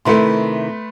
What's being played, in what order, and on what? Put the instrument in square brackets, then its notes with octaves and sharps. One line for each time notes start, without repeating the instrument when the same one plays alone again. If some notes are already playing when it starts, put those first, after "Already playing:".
[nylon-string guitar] C3 D#3 E4 [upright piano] A3 B4 C6